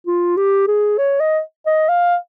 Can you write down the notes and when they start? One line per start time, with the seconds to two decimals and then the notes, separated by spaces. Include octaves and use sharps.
0.07 F4
0.37 G4
0.67 G#4
0.98 C#5
1.20 D#5
1.66 D#5
1.89 F5